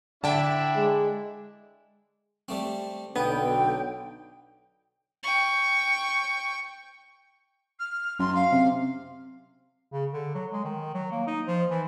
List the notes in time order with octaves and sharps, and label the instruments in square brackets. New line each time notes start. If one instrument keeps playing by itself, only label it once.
[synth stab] D3 [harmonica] D4 E4 [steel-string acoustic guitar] E5 G5 A5
[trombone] G#3
[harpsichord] G3 A3 C4
[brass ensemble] B1 D3 F#3 [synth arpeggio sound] B3 [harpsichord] D#4 [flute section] G5
[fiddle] G5 C#6
[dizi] F6
[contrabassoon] F#2 [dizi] C6
[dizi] F5
[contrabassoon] C3
[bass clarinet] C#3
D3
F#3
G#3
D#3
F#3
A#3
D#4
F3
E3